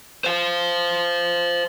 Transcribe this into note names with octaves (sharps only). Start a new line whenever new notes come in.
C5 F5